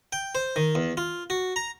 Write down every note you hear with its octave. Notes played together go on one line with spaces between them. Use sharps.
G5
C5
D#3
E2
F4
F#4
A#5